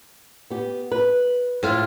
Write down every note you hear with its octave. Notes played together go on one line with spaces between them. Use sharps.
B3 G4
B4
A2 F4